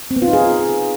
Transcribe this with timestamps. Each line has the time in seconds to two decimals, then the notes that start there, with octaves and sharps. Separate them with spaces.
0.11 C4
0.16 B3
0.22 F4
0.28 D#4
0.33 G#4